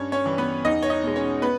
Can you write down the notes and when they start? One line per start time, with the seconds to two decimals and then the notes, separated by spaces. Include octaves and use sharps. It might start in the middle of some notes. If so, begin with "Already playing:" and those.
Already playing: G2 C#4 C#5
0.12 C#4 C#5
0.26 E3 G3
0.38 B3 B4
0.65 E2 D#4 D#5
0.83 C#5
0.90 D#4 D#5
1.03 B2 G#3
1.16 C#4 C#5
1.42 B3 B4